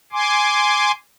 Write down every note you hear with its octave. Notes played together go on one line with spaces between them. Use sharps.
G#5 C6 D6